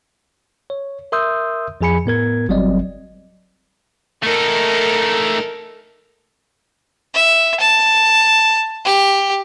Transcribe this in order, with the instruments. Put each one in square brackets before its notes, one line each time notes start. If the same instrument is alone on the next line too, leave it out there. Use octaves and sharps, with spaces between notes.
[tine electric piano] C#5
A#4 E5 C6 D#6 E6 G6
F2 F3 G#4 G#5 B5 C#7
A2 B3 A#4 G#6
G1 F#3 G3 C4 D5 D#5
[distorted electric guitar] A3 D#4 [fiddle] A4 A#4
[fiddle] E5
A5
G4